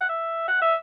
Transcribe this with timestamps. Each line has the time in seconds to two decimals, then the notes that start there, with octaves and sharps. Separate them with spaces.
0.01 F#5
0.09 E5
0.48 F#5
0.61 E5